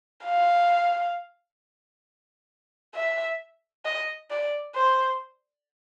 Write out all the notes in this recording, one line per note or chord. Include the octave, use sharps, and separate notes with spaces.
F5
E5
D#5
D5
C5